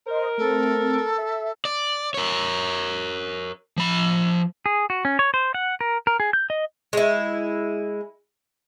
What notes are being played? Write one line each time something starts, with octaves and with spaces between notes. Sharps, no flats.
A#4 C5 D#5
A3 C4 A4
E5
D5
A#4 C#5
F3 B5
G#4
F#4
C#4
C#5
C5
F#5
A#4
A#4
G#4
G6
D#5
G#3 E4